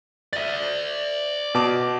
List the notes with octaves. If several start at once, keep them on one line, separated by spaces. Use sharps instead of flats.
D5 E5 A6
B2 A5 D6